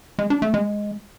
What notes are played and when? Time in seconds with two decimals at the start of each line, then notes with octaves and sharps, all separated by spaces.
0.19 G#3
0.30 D4
0.42 A3
0.54 G#3